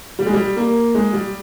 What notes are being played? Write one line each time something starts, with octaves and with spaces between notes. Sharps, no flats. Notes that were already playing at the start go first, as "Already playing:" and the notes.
G3
G#3
G3
A#3
G#3
G3